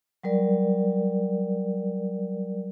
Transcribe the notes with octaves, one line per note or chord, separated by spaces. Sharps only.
F#3 G3 A#4 D5